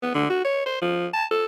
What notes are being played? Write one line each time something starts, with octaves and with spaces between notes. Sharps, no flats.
B3
D3
F#4
C#5
C5
F3
A5
A4